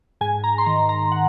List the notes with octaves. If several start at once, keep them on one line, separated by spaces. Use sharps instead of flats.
G#2 G#5
A#5
C6
D#3 A#5
A#5
F#5